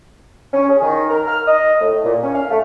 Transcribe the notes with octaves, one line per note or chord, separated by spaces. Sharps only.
C#4
G#4
D#3
A#4
F6
D#5
A2
A#2
C#4
F5
A3